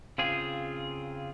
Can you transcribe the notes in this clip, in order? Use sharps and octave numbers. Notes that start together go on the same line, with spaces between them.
C#3 C4 F4 G#4